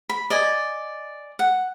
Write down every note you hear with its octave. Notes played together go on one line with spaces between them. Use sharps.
B5
D5 D#5 G#5
F#5